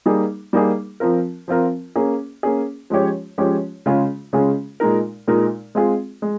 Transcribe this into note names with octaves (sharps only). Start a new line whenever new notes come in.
G3 A#3 D#4 G#4
G3 A#3 D#4 G#4
F3 C4 F4 A#4
F3 C4 F4 A#4
A#3 C#4 G#4
A#3 C#4 G#4
F3 G#3 C#4 G4 C#5
F3 G#3 C#4 G4 C#5
C#3 G#3 C#4 F4 G#4
C#3 G#3 C#4 F4 G#4
A#2 G#3 D#4 A#4
A#2 G#3 D#4 A#4
G#3 C4 F4 G#4
G#3